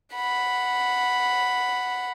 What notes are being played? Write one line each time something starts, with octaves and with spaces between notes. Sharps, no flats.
F#5 B5